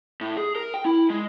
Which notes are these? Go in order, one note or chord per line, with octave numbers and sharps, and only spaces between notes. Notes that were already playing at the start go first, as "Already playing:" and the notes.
A2
G#4
A#4
G5
E4
G#3